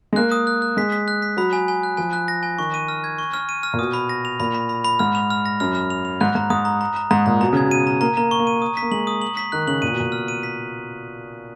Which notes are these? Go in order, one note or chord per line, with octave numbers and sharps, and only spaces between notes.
G#3
A#3 F#6
D#6
F#6
F#6
G#3 B6
B6
F#6
B6
F#3 B5
G#5
G#5
F#6
F3 G#5
F#6
A#6
G#5
D#3 C#6
D#7
F6
G#6
C#6
F6
D#7
F6
A#2
B2 D#6
B5
A#6
F7
A#2 B5
B5
B5
B5
G#2 F6
F7
F6
A#6
F#2 F6
F6
F7
F7
G#2 F#6
G#2 A#5
G#2 D#6
A#5
A#5
A#5
G#2 A#5
A#2 A#5
B2 A#5
C#3 G#6
B2
D#7
A#5
A#3 A#5
A#3 A#5
C#6
A#3
D#7
D#6
B6
A#3
G#3 F#7
D#6
F#7
B6
D#3 F#6
C#3 F#7
A#2 D#7
B2
A#2 D#7
F6
D#7
B6